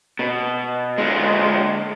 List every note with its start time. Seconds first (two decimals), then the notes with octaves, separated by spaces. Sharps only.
0.19 B2
0.98 D3 G#3